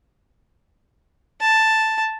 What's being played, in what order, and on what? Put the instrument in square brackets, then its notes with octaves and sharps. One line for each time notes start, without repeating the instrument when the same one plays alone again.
[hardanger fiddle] A5